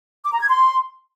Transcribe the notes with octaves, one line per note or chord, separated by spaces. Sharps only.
D6
A#5
G#6
C6